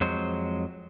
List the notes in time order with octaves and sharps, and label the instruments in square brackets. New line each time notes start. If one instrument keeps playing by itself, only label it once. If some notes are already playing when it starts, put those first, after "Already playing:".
[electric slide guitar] F2 F#3 G#3 C5